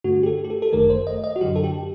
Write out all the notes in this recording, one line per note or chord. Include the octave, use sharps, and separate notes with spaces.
G2 D3 A3 F#4
G4
A4
G4
A4
A4
G1 F#2 D#3 A3 A#4
C5
D#5
D#5
F#4
F#2 D3 F#3 G4
A4
G4